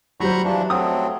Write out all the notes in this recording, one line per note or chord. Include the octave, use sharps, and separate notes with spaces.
F#3 G3 C5 A#5 B5 C#6
E3 F3 D4
F#3 A3 C4 D#6